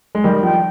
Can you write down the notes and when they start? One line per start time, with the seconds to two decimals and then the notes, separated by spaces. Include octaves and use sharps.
0.15 G#3
0.24 D#3 G3 D#5
0.43 F3 G5